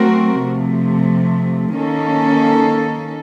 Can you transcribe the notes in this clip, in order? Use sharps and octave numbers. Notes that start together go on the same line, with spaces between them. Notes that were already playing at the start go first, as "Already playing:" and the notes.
Already playing: F#3 A3 C4 F#4 A#4
C3 F3 A3
D#3 A#3 C#4 A4